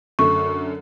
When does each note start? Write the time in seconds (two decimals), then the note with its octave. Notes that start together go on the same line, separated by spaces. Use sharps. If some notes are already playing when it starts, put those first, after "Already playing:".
0.19 F#2 D3 A3 C#6